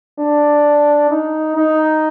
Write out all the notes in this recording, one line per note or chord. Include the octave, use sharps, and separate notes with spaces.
D4
D#4
D#4